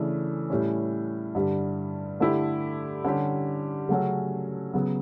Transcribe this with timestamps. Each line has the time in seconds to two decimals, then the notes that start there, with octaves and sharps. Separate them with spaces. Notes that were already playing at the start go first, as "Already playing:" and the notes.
Already playing: C#3 E3 A3 D4
0.50 A2 G3 C#4
1.35 G2 D3 G3
2.20 D3 A3 E4 G4
3.04 D3 G3 C#4 G4
3.89 C#3 F#3 A3 C#4 F#4
4.74 C#3 F#3 B3